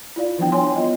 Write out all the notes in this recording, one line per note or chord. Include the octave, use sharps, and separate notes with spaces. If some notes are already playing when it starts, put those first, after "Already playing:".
E4 F4 D5 F5
E3 F3 G3 B3 D4 G5
C#5 G#5 C6
B3 F4 D#5